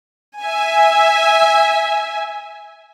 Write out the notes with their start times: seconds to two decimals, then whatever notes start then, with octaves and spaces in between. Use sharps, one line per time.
0.42 E5 G#5